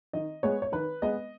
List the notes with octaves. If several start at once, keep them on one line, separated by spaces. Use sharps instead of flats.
D#3 D#5
G#3 B3 C#5
C#5
D#3 B4
G#3 B3 D#5